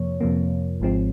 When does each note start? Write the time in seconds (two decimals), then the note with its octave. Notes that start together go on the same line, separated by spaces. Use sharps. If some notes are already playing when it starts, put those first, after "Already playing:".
Already playing: F2 C3 F3 A#3 C#5
0.21 F2 C3 F3 A#3
0.80 G#1 G#2 F3 G#3 C4